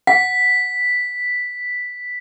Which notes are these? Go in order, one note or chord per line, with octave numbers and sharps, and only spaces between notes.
F#5 B6